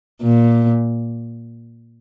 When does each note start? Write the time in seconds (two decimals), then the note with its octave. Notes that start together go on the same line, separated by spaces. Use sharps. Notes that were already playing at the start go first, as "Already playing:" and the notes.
0.22 A#2